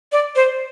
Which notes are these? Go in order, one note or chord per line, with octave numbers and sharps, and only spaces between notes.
D5
C5